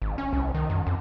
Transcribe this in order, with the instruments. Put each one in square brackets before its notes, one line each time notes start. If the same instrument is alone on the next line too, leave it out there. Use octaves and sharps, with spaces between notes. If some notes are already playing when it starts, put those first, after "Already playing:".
[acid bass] G#1
C#4
C2
D#3
F#2
F2